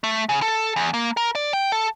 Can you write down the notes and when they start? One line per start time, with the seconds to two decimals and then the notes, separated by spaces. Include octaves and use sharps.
0.04 A3
0.29 C#3
0.42 A4
0.76 E2
0.94 A#3
1.17 A#4
1.35 D5
1.53 G5
1.72 A4